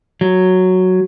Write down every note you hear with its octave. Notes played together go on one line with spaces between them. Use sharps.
F#3